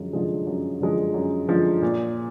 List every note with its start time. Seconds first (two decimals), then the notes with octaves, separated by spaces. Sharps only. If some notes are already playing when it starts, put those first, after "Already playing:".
Already playing: F#2 D3 F3 G#3
0.13 D3 F3 G#3
0.47 F#2
0.81 D3 F3 G#3
1.14 F#2
1.48 D3 F3 G#3
1.82 A#2